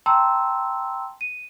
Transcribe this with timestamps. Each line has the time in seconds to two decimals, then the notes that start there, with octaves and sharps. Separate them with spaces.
0.06 G5 A5 A#5 C6 E6
1.21 D#7